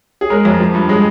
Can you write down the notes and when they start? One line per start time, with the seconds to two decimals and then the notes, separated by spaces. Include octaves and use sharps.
0.21 G#4
0.30 G#3 A#4
0.45 F2
0.60 F3
0.75 G2
0.89 G#3 D#5